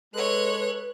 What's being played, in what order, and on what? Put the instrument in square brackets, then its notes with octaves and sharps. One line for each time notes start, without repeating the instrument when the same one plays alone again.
[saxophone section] G#3 A4 [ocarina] B4 [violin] C#5 F#6